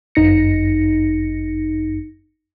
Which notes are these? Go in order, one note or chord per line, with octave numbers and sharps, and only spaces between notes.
G1 F#2 D#4 A#6 C#7